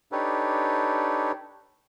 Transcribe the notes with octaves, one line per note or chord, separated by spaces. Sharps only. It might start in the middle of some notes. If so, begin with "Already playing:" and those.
D4 D#4 G4 A4 B4 C#5